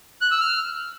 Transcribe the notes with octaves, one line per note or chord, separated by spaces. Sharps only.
F#6
E6
F6